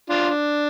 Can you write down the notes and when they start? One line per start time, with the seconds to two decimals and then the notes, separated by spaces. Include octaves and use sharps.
0.10 D4 F4
0.30 D4